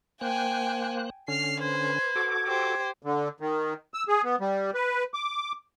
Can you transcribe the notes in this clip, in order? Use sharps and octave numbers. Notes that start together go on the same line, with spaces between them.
A#3 C5 G5 G#5 F#6
D3 C#4 F6 C7
B4 C5 G#6
F#4 A4 D6
G4 C5
D3
D#3
E6
G#4
B3
G3
B4
D6